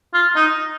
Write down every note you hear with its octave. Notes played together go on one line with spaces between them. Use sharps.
F4
D#4